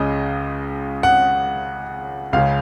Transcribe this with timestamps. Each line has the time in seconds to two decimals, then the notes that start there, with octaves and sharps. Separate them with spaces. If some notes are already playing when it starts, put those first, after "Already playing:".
Already playing: C#2 C#3 D#5
1.03 F#5
2.33 C#2 C#3 F5